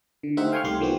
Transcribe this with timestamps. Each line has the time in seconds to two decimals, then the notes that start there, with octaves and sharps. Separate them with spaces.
0.23 D3
0.37 A3 D#4 G4 C5 E5 F#5
0.52 F5 G5 G#5 C6 C#6 F6
0.64 C2 G3 A3 G4 C6
0.80 D#3 F3 B3 F#4 G4